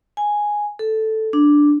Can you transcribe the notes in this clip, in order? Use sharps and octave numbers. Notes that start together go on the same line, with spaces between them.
G#5
A4
D4